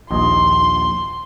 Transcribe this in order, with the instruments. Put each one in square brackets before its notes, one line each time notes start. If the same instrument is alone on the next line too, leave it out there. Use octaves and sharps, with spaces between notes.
[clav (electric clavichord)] A#1 D#2 D#5 [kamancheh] C6